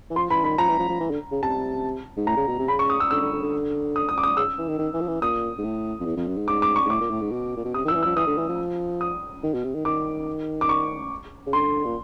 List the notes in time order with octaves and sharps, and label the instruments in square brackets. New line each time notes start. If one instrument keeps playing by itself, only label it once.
[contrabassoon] E3
[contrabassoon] F3 [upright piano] C6
[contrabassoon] E3 [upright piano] B5
[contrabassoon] D#3 [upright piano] B5
[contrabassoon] F3 [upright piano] A#5
[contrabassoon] E3
F3
F3
E3
D3
C#3
[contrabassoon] C3 [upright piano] A5
[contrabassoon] G#2
[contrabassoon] A2 [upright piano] A#5
[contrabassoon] C#3
B2
C3
[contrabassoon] C#3 [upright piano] B5
[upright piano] C#6
D#6
E6
[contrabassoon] D3 [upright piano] E6
[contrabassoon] D3
D3
D3
[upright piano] D#6
D#6
D6
D#6
[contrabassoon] C#3 [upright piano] E6
[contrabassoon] E3
D#3
D#3
E3
F3
E3
[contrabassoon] A#2 [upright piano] D#6
[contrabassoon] G#2
A2
F2
E2
F2
F#2
G#2
[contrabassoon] G#2 [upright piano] D6
[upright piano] D6
C#6
[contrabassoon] G#2
[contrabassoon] A2 [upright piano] D6
[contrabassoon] A#2
A2
G#2
B2
A#2
B2
[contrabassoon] C3 [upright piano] D#6
[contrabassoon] D#3
[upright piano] E6
[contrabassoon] F3
E3
[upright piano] E6
[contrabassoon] F3
[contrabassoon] E3 [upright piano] D#6
[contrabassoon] D3
E3
F3
[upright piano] D#6
[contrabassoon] D#3
B2
C3
D#3
[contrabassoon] D#3 [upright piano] D6
[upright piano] D6
C#6
[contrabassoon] C#3
[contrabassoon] D3 [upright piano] C6
[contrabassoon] A#2